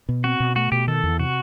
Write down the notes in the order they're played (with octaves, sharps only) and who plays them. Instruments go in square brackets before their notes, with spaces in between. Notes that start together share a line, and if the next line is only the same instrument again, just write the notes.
[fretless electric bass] B2
[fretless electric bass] C4 [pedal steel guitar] F#4
[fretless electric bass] B2
[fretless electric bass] A3 [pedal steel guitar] F#4
[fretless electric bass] B2 [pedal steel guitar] G4
[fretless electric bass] D#3 [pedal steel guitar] A4
[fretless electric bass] E2
[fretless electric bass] C3 [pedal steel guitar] F#4